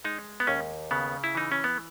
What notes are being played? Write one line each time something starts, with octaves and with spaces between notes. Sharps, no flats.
G#3 D#4
B3
D#2 C#4
C#3 B3
E4
E3 D#4
C#4
B3